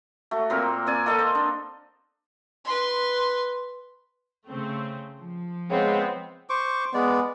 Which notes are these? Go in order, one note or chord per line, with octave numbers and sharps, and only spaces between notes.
A3 F#4
A#2 A#3 C4 A#4
C4 D5 G#5
A#3 A4 D#5
C5
D4
B4 C6
C#3 A3 C4
F3
C#3 G#3 B3 C4
C5 C#6 D6
G#3 B3 D5